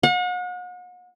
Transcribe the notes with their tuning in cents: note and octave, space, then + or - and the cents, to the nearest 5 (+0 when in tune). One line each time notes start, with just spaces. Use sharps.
F#5 -40